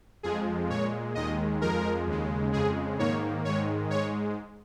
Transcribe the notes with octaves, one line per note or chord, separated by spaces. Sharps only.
F2 F3 G#3 G#4
A#2 G#3 C#5
D#2 D#3 G#3 D#5
F2 F3 G#3 A#4
D#2 C#3 G#3
F2 C#3 G#3 G#4
G#2 D#3 A#3 C#5
G#2 D#3 G#3 C#5
G#2 G#3 C#5